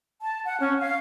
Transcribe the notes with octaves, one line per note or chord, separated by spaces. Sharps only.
A5
F#5
C#4
F5